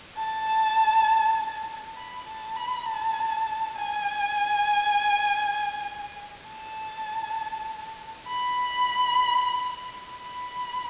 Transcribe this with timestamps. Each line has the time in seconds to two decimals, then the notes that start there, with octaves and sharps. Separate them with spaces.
0.16 A5
1.96 B5
2.27 A5
2.56 B5
2.86 A5
3.76 G#5
6.47 A5
8.27 B5
10.08 B5